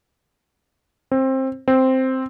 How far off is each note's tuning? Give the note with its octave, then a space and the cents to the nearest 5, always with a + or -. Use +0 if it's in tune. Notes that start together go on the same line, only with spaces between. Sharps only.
C4 +20
C4 +0